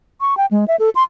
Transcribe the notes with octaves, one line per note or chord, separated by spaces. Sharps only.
C#6
G5
G#3
E5
A4
C6